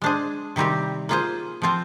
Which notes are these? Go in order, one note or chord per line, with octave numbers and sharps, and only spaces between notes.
G#3 D4 G#4 C5
C3 D#3 G3 C4 G4
A#3 F4 G#4 C5
F3 C4 F4 C5